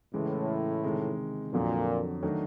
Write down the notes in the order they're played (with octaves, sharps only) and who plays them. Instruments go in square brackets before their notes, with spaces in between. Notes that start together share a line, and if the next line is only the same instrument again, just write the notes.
[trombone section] A2 [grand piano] C#3 E3 G#3
[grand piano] C3 D#3 G#3
[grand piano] F2 D3 F#3 [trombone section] A#2
[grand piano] D#3 F#3 A3 D4 F#4